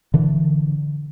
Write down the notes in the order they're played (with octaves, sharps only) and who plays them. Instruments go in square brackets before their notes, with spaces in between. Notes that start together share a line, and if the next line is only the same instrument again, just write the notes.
[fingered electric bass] D3 E3